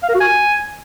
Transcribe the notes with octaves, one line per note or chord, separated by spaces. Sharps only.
F5
A#4
F#4
G#5